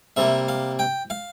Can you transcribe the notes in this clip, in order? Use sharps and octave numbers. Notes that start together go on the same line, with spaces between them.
C3 G3 A#3 E5
F5
G5
F5